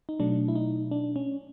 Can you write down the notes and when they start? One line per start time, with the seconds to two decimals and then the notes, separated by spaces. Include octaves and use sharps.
0.09 D#4
0.20 B2 F#3 A3 D4
0.48 E4
0.55 D#4
0.91 D4
1.16 C#4